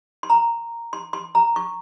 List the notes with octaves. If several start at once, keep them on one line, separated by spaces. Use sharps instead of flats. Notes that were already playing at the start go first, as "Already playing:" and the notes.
C6
A#5
C6
C6
A#5
C#6